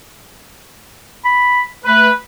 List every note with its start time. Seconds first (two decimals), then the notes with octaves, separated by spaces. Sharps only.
1.25 B5
1.85 A3 B4